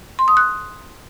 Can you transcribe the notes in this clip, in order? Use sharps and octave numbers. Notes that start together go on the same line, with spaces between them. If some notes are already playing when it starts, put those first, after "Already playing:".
C6
D#6
F#6